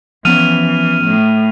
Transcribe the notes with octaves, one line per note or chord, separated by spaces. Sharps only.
E3 F3 B3 C#4 F6 D#7 F7
A2